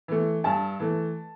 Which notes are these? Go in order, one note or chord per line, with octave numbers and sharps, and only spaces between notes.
E3 A3
G2 A5
E3 A3